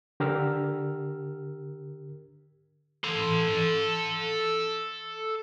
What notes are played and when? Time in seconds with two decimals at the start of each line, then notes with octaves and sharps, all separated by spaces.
0.20 D3 G4 A#4 E6 F6
3.04 A4 C6